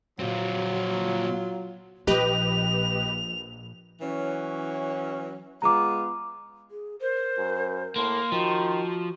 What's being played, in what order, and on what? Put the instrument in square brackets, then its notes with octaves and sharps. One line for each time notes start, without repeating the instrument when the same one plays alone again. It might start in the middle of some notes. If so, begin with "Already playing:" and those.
[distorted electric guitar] A#2 C4 [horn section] F#3 F4
[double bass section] A#1 [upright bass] F3 [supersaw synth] G4 B4 D#5 [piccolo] F7
[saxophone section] E3 F#3 C#4
[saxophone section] G#3 B3 F4 [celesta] A#5 D6
[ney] G#4
[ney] A#4 [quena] C5
[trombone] F#2
[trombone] A2 [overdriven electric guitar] A#3 [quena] C6
[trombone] D#3 [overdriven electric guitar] F3 [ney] F#4